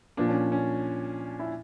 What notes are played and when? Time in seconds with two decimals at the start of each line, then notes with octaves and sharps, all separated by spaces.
0.17 A#2 F3 D4
0.29 C#4
0.52 C#4
1.39 E4